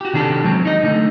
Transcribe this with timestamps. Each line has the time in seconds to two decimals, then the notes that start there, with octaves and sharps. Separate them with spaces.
0.01 F#4 G4
0.13 C3 D#3 D4 G4 A4
0.44 F#3 G#3 C4
0.65 D#4 D#5
0.83 D3 A3 D#4